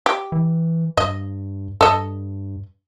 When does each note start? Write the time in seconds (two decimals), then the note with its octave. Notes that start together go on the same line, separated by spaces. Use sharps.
0.06 G4
0.32 E3
0.97 G2 D#5
1.81 G2 A4 D#5